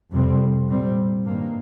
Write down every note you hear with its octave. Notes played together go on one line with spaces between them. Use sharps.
F2 C3 G3 C4
A#2 G3 C4
G2 D#3 A#3